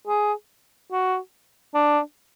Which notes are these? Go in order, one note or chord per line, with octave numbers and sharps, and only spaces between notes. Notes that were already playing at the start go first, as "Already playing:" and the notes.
G#4
F#4
D4